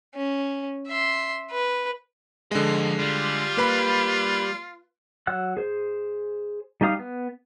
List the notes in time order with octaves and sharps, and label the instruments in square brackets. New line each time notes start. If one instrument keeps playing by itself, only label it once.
[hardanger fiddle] C#4
E5 C6
B4
[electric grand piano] D3 G#3 [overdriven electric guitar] F3 D#5
[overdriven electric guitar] G3 [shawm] F4
[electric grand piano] A#3 B4 B5
[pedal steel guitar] F#3 F#5 E6 F#6
G#4 C5
G3 D#4 G4 F5 D#6
B3